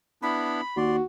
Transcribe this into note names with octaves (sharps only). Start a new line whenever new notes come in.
B3 D4 E4 B5
D#2 F#4 D5 C6